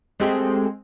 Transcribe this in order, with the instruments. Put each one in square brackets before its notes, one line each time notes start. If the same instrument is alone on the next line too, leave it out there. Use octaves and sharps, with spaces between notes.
[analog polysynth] G#3 C4 [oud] A3 G4 G#4